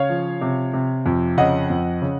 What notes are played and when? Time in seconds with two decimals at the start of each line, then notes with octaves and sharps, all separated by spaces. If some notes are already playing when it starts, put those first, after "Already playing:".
Already playing: C#3 C#5 F5
0.09 F3
0.41 C3
0.73 C3
1.06 F2
1.37 C#3 D#5 F#5
1.70 F2
2.02 C#3